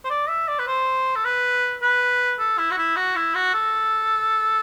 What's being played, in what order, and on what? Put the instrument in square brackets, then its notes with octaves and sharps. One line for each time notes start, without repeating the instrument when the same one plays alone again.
[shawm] C5
D5
E5
D5
B4
C5
A4
B4
B4
A4
E4
F#4
E4
F#4
E4
F#4
A4